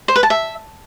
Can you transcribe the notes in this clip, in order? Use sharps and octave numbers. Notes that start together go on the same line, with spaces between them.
C5
B4
A5
E5